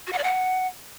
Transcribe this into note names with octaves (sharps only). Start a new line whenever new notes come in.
F#4
F#5
D5
F#5